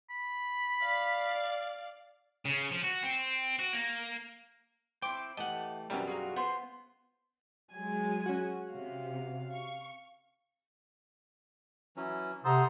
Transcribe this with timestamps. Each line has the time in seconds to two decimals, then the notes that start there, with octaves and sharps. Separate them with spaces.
0.10 B5
0.82 D5 F5
2.45 C#3
2.71 F3
2.83 F#4
3.03 C4
3.59 F#4
3.73 A#3
5.02 C4 E4 C5 G5 D6
5.37 E3 A3 G4 D#5 F#5 A5
5.90 F#2 B2 G3 C4 E4 A#4
6.07 F4 F#4 G#4 A#4
6.36 B3 C5 C6
7.72 F#3 G#3 G#5
8.26 C#4 F#4
8.73 C3 F5
9.53 C#6
11.97 E3 F#3 C#4
12.44 C3 A4 C5 F#5 A#5 C6 D#6